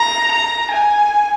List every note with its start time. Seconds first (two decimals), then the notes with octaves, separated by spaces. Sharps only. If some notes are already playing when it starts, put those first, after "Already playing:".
Already playing: A#5
0.32 A#5
0.71 G#5